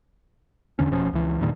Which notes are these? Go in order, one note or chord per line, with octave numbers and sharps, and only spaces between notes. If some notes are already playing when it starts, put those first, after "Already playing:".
E2 D3 C#4
F1 B2 F3 C#4
C#2 E3
E2 G2 A#2 D#3